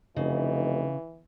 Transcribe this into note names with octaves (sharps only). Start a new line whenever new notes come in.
F1 C#3 E3 D#4